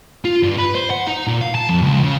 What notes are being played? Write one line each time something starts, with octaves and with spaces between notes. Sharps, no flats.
F4
G2
B4
C5
F#5
D#4
A#2
F5
A5
F2
C#2
C#3